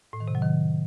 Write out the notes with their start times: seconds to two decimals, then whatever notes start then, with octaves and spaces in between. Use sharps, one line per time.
0.13 A2
0.20 D#3
0.28 C3
0.35 F#3
0.42 D#3